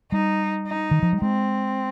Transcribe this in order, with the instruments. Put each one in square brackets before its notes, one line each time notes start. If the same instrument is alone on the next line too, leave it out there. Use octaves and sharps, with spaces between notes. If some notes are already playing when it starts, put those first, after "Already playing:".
[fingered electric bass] G3 [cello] D#4
[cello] D#4
[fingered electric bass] D#3
F3
G3
[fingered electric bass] G#3 [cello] C4